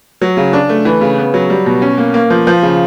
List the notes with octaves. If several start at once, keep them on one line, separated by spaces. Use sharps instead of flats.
F#3
C#3
D4
A3
E3
C#3
B3
F#3
G3
B2
C#4
A#3
A#3
F3
F3
C#3